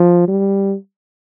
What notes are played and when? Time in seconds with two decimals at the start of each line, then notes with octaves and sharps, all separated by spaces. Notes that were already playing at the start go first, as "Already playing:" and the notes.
Already playing: F3
0.28 G3